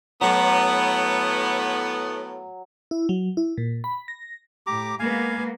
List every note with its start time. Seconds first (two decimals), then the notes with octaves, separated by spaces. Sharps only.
0.21 A2 F#3 B3
2.91 E4
3.09 F#3
3.37 E4
3.58 A#2
3.84 B5
4.08 A#6
4.67 A2 G4 A#5 D6
4.99 G#3 A#3 B3 F5 G#5